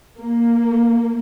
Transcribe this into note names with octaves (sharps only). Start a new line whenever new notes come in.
A#3